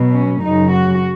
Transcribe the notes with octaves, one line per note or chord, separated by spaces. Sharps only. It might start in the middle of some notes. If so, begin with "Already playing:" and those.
Already playing: B2 F#3
C#4
F#2 C#3 F#3 D#4
F#4